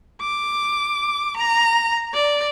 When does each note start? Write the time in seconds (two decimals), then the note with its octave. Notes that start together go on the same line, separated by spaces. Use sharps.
0.21 D6
1.37 A#5
2.14 D5